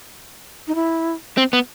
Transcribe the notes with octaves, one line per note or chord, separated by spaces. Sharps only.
D#4
E4
C4
B3